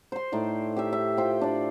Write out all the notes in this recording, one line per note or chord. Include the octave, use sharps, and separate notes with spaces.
C5 C6
A2 D#4 D5
G4 D#5 E5
E5
F4 C5 G5
D4 D5